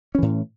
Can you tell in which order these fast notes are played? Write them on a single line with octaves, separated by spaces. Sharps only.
C#4 E3 A2